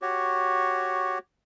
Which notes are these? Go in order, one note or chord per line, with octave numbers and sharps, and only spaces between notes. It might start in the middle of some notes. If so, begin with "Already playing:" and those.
F#4 G4 C#5